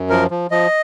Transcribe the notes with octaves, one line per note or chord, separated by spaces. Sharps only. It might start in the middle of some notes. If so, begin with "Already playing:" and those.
Already playing: F#2
F3 A#4
F3
F3 D#5